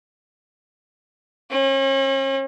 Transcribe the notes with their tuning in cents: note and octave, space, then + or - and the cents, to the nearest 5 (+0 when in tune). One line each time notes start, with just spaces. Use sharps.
C#4 -40